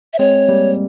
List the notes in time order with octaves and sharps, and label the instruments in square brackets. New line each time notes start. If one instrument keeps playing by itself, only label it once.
[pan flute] E5
[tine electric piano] G#3 C4 [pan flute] C#5
[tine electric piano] G3 A#3